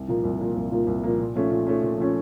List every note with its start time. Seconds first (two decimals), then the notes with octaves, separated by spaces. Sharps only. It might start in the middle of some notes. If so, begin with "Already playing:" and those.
Already playing: C2
0.08 A#2 F3 A#3
0.24 C2
0.40 A#2 F3 A#3
0.56 C2
0.71 A#2 F3 A#3
0.87 C2
1.04 A#2 F3 A#3
1.19 A#2
1.36 F3 A3 C#4
1.51 A#2
1.67 F3 A3 C#4
1.83 A#2
1.98 F3 A3 C#4